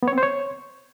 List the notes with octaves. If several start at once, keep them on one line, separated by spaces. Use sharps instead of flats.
B3
C#5
C4
C5
C#5